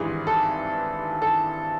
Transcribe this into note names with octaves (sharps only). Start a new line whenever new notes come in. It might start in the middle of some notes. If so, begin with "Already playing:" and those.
Already playing: G#1 G2 E3 G#4
A4
A4